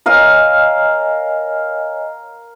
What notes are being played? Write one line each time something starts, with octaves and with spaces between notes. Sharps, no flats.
A#4 C#5 D#5 F5 G#5